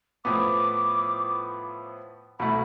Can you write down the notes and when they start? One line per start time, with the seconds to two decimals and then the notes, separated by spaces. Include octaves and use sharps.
0.24 A2 F3 B3 D6
2.39 C2 B2 A3 E4 B5